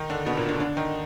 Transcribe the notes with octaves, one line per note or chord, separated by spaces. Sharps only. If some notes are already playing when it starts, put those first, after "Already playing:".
Already playing: D#3 D#4
D3 D4
B2 B3
A#2 A#3
D3 D4
D3 D4
D#3 D#4